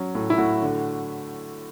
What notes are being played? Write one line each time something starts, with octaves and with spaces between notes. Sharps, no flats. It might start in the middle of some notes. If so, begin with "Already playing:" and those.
Already playing: F#3 C#4
A2
E4
A2 F#4
D3